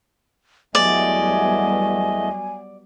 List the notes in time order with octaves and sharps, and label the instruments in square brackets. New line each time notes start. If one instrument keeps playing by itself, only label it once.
[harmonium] E2 A3 D#5 [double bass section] F#3 G3 B3 [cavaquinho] D5 [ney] G#5